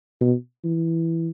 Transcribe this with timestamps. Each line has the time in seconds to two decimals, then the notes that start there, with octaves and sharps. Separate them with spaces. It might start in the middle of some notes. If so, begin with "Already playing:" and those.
0.21 B2
0.64 E3